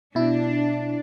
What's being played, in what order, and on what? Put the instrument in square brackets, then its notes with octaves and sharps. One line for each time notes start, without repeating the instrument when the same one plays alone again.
[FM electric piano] B2 E4 [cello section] D4